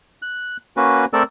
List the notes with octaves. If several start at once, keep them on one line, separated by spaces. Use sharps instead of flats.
F#6
A#3 C#4 F#4 B4
A3 C4 A4 A#4 D5 E6